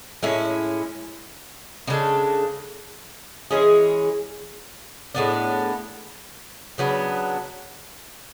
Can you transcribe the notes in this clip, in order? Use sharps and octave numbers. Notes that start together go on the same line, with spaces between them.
A2 G#3 C#4 E4
C#3 G#3 D4 A4
E3 G#3 C#4 G#4
A2 G#3 B3 D4
C#3 F#3 B3 D4